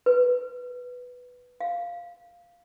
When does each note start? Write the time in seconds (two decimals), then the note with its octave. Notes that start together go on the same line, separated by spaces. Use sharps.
0.06 B4
1.61 F5